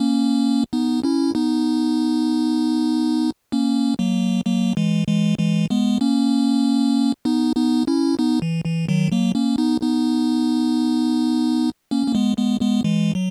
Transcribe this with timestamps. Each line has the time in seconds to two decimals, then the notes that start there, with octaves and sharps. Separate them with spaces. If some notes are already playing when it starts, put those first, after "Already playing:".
Already playing: A#3 C#4
0.73 B3 D#4
1.03 C#4 E4
1.35 B3 D#4
3.52 A#3 C#4
3.99 F#3 A#3
4.45 F#3 A#3
4.77 E3 G#3
5.07 E3 G#3
5.39 E3 G#3
5.70 G#3 B3
6.01 A#3 C#4
7.25 B3 D#4
7.56 B3 D#4
7.87 C#4 E4
8.19 B3 D#4
8.42 E3
8.65 E3
8.89 D#3 F#3
9.12 F#3 A#3
9.35 A#3 C#4
9.58 B3 D#4
9.82 B3 D#4
11.91 A#3 C#4
12.07 A#3
12.15 G#3 B3
12.37 G#3 B3
12.61 G#3 B3
12.84 E3 G#3
13.15 F#3